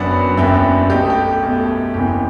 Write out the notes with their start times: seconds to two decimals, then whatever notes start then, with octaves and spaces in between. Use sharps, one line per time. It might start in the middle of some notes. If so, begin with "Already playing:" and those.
Already playing: F#1 F#2 F#3 B3 D4 D5 F#5
0.37 F#1 F#2 F#3 B3 D4 E5 G5
0.90 B1 B2 A3 G4
1.00 A4
1.10 G4
1.42 B1 B2 A3
1.94 F#1 E2 C3 E3 G4